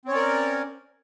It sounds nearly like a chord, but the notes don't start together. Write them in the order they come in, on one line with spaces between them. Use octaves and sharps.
C4 C#5 C#4 D5 A#4